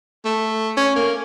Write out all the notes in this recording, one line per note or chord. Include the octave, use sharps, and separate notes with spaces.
A3
C#4
A#3